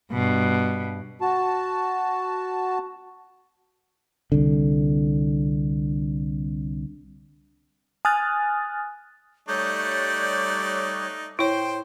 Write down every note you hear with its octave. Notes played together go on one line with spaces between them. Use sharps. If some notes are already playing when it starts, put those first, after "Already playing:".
G2 B2
F#4 A5
C2 D3
G#5 D#6 F6 F#6 A6
G3 A3 D#4 C#5 D5 F#6 G6
A2 E4 C5 C#5 G5